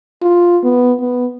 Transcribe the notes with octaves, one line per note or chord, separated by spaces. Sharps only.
F4
B3
B3